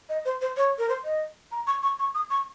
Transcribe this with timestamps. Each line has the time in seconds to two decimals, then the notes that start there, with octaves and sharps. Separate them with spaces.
0.09 D#5
0.25 C5
0.41 C5
0.57 C#5
0.78 A#4
0.89 C5
1.04 D#5
1.52 A#5
1.67 C#6
1.83 C#6
1.99 C#6
2.15 D#6
2.30 C#6